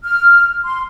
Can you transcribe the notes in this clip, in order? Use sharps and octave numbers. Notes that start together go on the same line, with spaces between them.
F6
C6